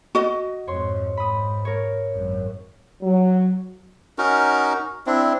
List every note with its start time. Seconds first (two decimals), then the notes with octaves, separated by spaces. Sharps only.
0.15 F#4 D#5
0.67 F2 G#2 C#5 C6
1.17 G#2 B5 D#6
1.65 A#4 C#5
2.13 G#1 F#2
3.02 F#3
4.18 C#4 D#4 F#4 A#4
5.07 C4 D4 E4